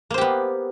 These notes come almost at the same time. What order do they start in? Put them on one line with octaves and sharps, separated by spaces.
A#3 C5 G4 B3